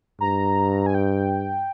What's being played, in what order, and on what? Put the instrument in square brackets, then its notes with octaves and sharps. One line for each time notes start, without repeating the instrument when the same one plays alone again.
[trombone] G2 [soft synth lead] A#5
[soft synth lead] G#5
G5